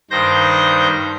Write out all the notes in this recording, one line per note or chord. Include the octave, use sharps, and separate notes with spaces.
G2 D#3 C5 G6 A#6